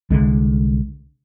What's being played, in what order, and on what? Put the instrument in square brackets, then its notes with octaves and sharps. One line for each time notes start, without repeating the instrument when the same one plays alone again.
[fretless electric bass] C2 D3 G#3